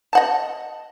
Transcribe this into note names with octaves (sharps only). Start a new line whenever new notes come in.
D#5 F#5 A5